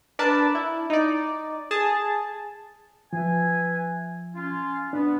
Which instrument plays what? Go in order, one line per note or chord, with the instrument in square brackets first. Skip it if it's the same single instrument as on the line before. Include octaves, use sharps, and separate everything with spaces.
[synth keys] D4 A#4 B4 D5 A5
E4
D#4 D5
G#4 A5
[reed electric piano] F3 [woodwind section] B4 E5 G#5
[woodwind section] C#4 F4
[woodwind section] B3 [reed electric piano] D4